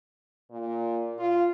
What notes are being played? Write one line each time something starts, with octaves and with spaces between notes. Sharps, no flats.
A#2
F4